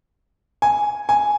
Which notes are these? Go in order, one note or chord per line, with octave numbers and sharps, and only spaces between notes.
G#5
G#5